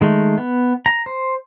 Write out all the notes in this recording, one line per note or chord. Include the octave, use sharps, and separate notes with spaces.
D#3 G#3 A3
B3
A#5
C5